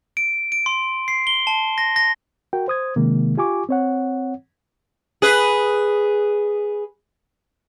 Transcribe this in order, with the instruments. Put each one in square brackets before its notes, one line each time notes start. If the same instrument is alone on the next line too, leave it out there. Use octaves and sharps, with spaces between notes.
[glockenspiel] D7
D7
C6
C7
G7
A5
A#6
A#6
[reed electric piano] F#4 A#4 G5
C5 D#6 G#6
C3 D#3 G#3 A#3
F4 G4 G#5 C#6 D6
C4 C#5 F#5
[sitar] G#4 B4